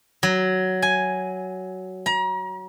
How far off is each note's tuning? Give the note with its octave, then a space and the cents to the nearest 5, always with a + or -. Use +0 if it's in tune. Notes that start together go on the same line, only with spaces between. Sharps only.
F#3 +10
G#5 +5
A#5 +35